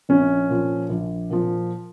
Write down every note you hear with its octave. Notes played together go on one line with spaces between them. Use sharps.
A#1 C#4
A#2 F3
A#1
A#2 F3